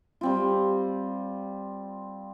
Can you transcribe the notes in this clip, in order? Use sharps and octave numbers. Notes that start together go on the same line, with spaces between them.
G3 C4 F4